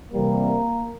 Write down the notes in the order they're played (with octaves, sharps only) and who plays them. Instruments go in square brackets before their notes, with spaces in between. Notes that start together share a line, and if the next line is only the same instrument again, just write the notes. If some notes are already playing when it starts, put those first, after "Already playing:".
[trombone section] C2 C3 E3 G3 A#3 A#4